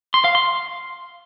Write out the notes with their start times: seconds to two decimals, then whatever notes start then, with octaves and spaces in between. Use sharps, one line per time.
0.14 C6
0.24 F5
0.35 C6